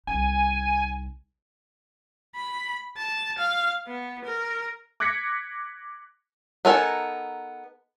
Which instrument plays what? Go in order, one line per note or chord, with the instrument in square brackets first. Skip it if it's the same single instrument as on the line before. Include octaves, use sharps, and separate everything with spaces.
[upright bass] C2 D#4 [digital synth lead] G#5
[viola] B5
A5
F5
B3
A#4
[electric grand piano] D6 F#6 G#6 A#6 B6 C#7
[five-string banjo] B3 D#4 A4 A#4 G#5